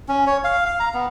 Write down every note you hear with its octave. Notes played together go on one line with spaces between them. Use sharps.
C#4
C#5
F5
F5
A#5
B3